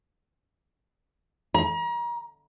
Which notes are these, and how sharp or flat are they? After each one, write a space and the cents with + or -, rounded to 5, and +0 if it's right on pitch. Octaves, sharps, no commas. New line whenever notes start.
A#5 +35